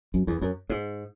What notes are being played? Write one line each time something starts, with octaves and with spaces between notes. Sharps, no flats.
F#2
E2
F#2
G#2